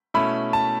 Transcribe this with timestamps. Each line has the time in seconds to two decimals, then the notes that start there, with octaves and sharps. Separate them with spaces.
0.14 B2 A3 C#4 E4 B5
0.53 A5